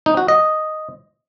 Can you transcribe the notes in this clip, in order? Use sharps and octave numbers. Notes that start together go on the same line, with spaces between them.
D#4
F#4
D#5